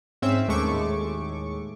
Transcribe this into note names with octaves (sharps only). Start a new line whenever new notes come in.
G#2 C4 C#4 E5 E6
D#2 A2 G#3 A3 C#6 D6